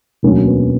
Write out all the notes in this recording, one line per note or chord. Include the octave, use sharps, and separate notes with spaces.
E1 D2 D3 F#3 A#3 C#4
B3